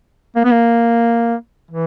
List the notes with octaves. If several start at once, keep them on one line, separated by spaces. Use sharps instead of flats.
A#3
B3
A#3
E3